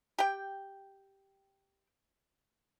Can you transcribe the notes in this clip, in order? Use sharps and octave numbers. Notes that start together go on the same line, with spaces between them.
G4 G5